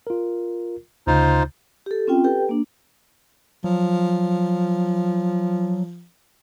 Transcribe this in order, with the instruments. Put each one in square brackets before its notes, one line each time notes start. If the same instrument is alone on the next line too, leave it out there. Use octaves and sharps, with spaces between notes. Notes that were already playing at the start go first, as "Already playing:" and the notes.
[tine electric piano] F4 A#4
[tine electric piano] D2 C#3 [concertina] D#4 F4 C5
[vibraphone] G4 A4
C4 C#4 F4 G5
G4 A4 B4 G5
A#3 D4
[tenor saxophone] F3 [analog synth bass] F#3